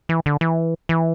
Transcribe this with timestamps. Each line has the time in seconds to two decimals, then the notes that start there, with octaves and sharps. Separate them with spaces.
0.09 E3
0.26 D3
0.41 E3
0.89 E3